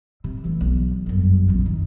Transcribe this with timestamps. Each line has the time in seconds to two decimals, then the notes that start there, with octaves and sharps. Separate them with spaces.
0.24 C3
0.44 E3 A3
0.61 B1
1.06 G1 F#2
1.48 A#1 F2
1.66 D#3